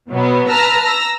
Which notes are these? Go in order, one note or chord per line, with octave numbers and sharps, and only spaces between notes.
B2 F#3 B3
B4 A5 A#5 E6 F6 A#6
A#5 E6 A#6